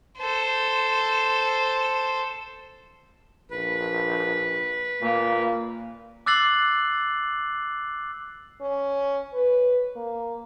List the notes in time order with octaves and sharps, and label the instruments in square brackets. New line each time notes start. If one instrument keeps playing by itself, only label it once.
[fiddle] A4 C5
[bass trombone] A#1 [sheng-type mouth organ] B4
[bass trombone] A#2 [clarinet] A#3
[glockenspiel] D6 E6 F#6 A6 C7 F#7
[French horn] C#4
B4
A#3